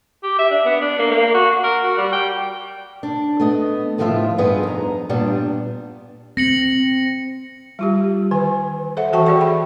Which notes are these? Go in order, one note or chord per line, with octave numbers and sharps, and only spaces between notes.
G4
E5
D4
B3
D4
A#3
A#3
F#4
A#4
F#4
G3
G5
D4
A3 B3 D#5
D#2 A2 D#3 F3 F4 E5
G2 B3 D#4 G#4 B4
F2 A#5
G2 A#2 G3 B3 D4
C4 A#6 C#7 F#7
G3 F4 G4
D#3 B4 G#5
A4 C5 E5 F#5
E3 F#4 A4 G5 A5 C#6
F#4 G#4 D5 E5 C#6
G5 B5